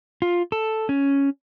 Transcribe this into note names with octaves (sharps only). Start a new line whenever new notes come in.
F4
A4
C#4